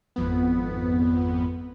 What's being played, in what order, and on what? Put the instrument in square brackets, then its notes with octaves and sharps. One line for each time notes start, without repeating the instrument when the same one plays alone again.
[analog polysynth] G#1 F2 B3